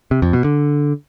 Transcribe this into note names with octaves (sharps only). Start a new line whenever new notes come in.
C3
F2
B2
D3